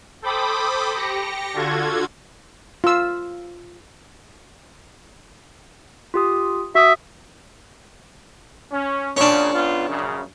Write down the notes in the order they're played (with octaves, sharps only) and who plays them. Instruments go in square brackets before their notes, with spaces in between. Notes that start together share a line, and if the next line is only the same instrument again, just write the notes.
[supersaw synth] A4 C5 G5 B5 D6 D#6
G4 A#6 C#7
D3 F4 F#4 A4 G#6
[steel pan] F4 E6
[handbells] F4 G4 D#6
[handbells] F#4 D#6 [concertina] E5
[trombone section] C#4
[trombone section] F#2 A#2 C#3 [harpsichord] C#4 D4
[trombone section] G#2 B3 F4
A#1 F#2 C#3